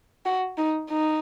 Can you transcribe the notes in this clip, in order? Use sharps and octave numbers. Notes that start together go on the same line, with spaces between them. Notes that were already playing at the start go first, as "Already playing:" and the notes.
F#4
D#4
D#4